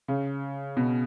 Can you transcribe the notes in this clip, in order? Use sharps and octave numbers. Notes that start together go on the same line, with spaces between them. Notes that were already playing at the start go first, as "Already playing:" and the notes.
C#3
B2